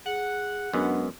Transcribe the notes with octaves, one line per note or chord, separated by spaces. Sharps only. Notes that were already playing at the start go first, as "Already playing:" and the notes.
G#4 F#5
F#2 G#3 B3 D4